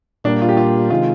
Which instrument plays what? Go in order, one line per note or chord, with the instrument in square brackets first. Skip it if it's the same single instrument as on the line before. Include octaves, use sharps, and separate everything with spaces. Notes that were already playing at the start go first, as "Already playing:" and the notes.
[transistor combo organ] A#2 G3 A#3 [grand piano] D4
[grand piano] F4
G4
F4
[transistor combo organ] C3 D#3 G#3 [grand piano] F4